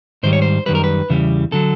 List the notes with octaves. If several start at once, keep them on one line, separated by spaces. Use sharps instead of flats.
G#2 D#3 G3 C5
C#5
C5
F#2 D#3 G3 B4
A#4
B4
E2 C#3 E3 G3
D3 F#3 A4